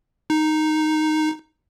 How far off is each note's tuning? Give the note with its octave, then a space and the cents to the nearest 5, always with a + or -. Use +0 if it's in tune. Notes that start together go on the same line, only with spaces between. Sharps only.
D#4 -5